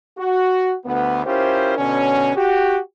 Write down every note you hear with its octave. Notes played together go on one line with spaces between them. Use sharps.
F#4
D2 B3
C#4 E4 F4 G4 A#4 C5
B2 D3 C#4
F#4 G4